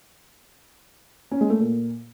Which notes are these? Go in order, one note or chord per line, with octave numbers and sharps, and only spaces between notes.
C#4
G#3
A3
A#2